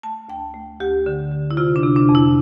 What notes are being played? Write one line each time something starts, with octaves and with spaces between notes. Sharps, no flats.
A3 A5
D2 G5
A3
D2 G4
D3
D3
E4
C3 F4
D4
C3
D4
F2
E4